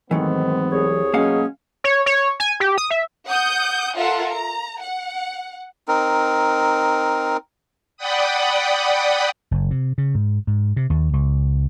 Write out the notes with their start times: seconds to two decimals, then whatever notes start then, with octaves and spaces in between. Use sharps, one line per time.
0.11 G#2 D#3 E3 F#3 A3 B3 C4
0.72 C2 G#4 C#5
1.14 F#2 B2 F#3 G#3 A#3 C#4 F5 F#5
1.84 C#5
2.06 C#5
2.40 G#5
2.60 G4
2.78 D#6
2.91 E5
3.27 F#5 D#6 G6
3.97 F4 A4 A#4 E5 F#5
4.31 A#5
4.82 F#5
5.88 C4 D#4 A#4
7.97 D5 F#5 G5 B5 D#6
9.51 F#1
9.71 C3
9.98 C#3
10.15 G#2
10.47 G#2
10.76 C3
10.90 D#2
11.13 C#2